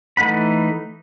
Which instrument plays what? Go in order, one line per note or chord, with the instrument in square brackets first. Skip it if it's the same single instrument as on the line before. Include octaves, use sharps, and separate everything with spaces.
[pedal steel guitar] E3 A3 D#4 F#5 B5